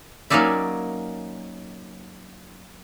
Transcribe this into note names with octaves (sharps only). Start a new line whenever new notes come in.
F#3 A#3 C#4 D#4 D5 E5